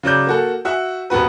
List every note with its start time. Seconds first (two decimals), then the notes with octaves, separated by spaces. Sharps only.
0.03 C#3 F#3 D5 G6
0.27 A#3 F#4 A4
0.65 F#4 E5
1.10 D#1 B3 F#4 B4